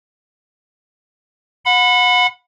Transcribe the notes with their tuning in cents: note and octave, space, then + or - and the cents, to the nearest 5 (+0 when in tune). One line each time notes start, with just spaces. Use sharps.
F#5 -30 B5 +15